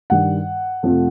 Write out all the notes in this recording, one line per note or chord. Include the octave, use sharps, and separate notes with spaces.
G2 D#3 G3 F#5
F2 C3 F3 A3